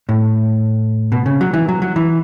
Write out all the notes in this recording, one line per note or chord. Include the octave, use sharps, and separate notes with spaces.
A2
B2
C#3
F#3
E3
F#3
F#3
E3